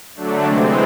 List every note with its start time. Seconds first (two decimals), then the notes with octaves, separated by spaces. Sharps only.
0.15 D3 F#3 A3 D4
0.44 C3 E3 G#3 C4